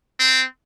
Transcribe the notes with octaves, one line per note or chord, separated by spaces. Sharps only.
C4